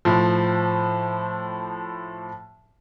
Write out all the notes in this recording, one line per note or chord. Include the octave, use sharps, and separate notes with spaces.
A2 F3